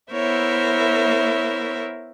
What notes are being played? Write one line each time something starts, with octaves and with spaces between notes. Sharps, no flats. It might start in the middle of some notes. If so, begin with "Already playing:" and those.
B3 E4 A#4 C5 C#5 E5